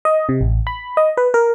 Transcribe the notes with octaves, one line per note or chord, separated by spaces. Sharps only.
D#5
C3
A1
B5
D#5
B4
A#4